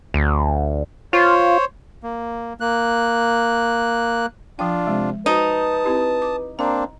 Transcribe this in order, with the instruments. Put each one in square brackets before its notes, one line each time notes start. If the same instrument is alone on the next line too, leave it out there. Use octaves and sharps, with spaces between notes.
[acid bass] D2
[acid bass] F4 [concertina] C5 C#5
[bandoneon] A#3
A#3 F#6
[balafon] F3 G5 [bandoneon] D4 F4
[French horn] C3 [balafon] G#3
[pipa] D#4 [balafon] F#4 C5 [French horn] B4 [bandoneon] A5 D#6
[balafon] C4 E4 G4
D6
[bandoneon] A#3 C4 D4 [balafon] A#5